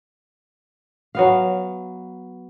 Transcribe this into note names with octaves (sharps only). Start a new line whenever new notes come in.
F#3 B3 F5